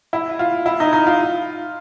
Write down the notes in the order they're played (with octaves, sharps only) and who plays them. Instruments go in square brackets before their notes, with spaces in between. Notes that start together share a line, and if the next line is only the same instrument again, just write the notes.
[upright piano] E4
F4
E4
D#4
D#4
F4